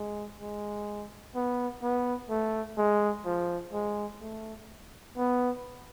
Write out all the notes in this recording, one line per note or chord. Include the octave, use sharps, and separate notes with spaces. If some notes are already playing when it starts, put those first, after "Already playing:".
Already playing: G#3
G#3
B3
B3
A3
G#3
F3
G#3
A3
B3